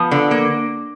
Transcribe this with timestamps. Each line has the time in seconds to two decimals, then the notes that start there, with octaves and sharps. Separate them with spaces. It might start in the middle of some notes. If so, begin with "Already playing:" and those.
Already playing: F3 B3
0.11 D3
0.31 A#3